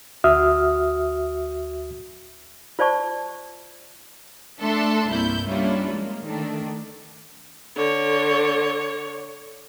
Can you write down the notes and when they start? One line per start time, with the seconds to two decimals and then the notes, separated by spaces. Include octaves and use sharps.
0.24 D2 F#4 E5 D#6 F6
2.79 F4 C5 D5 A5 C#6
4.60 A3 D4 A4 E5 C6
5.09 C2 G2 A#3 E4 G6
5.48 G3 A#3 C#4 D4 E4 F4
5.89 G#3 A#3
6.24 D#3 A3 D4
7.76 D3 C#5